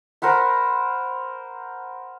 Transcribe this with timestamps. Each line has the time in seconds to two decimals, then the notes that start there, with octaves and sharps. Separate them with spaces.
0.22 A#4 C5 F#5 B5